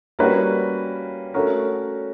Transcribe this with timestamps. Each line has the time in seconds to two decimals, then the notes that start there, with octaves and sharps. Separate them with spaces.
0.19 G3 A#3 C#4 F#4 B4
1.34 A3 C#4 F#4 A#4